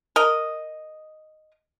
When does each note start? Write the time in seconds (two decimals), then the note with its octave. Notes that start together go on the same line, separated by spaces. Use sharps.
0.16 A#4 D#5